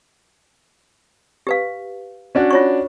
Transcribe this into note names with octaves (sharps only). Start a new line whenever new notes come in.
G4 B4 F5
C#4 D4 F#4
F4 C#5 C#6